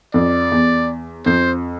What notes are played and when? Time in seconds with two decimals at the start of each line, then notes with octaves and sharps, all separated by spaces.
0.14 F2 D5
0.51 E2
1.26 F2 C5